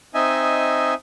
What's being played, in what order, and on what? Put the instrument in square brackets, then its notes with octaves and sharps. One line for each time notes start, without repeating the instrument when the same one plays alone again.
[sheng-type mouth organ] C4 D#4 D#5 E5 G#5